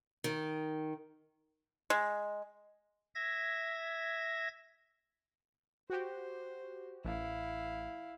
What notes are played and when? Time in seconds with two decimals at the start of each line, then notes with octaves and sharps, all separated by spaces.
0.24 D#3
1.90 G#3
3.15 E5 G#6 A#6
5.90 F#4 G4 C5
7.05 A1 E4 F5